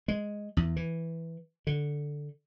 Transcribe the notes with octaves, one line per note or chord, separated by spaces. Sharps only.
G#3
E2
E3
D3